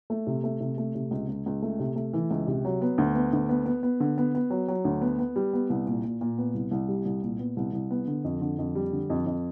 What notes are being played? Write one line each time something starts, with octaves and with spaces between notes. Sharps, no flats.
A3
C3
A3
C3
A3
C3
C#2
C#2
C#2
A3
C3
A3
E3
C#2
C3
F#3
B3
D2
B3
D2
B3
B3
B3
D3
B3
B3
F#3
F#3
D2
B3
B3
G3
B3
C2
A#2
A#2
A#2
B3
C2
C2
G3
C2
A#2
B3
C2
C2
B3
D3
F2
D3
F2
G3
D3
F2
F2